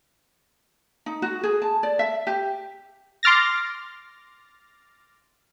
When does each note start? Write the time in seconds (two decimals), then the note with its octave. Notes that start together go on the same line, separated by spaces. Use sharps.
1.06 D#4
1.22 F#4
1.43 G#4
1.62 A5
1.83 D5
1.99 E5
2.27 G4
3.23 C6 D6 F6 A6 A#6